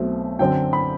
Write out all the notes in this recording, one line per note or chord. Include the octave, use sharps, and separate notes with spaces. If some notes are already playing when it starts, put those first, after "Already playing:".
Already playing: B1 B2 A3 C4
F#2 D3 F#3 C4 G5
B5